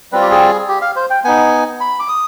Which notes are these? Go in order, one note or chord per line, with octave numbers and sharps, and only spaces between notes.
G3 C4 F4 B4
G4
G#4
G4
F5
C5
G5
B3 D#4 G#5
B5
D6
D#6